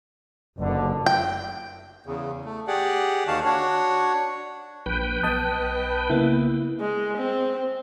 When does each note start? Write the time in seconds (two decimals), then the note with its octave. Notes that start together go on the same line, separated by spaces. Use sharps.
0.59 F#1 D#2 B2 D3
1.06 G5
2.06 E2 C#3
2.45 A3
2.67 G4 G#4 D5 F#5
3.28 D#2 D#3 F#4 F5 A5
3.45 D4 F#4 C#5
4.86 A#1 B4 G5
5.23 B1 D#5 A5 D#6
6.10 C#3 A#3 B3 E4
6.80 G#3
7.17 C4